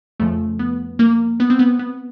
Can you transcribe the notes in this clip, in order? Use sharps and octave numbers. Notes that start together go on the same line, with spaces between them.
F2 C#3 F3 A3
B3
A#3
B3
C4
B3
B3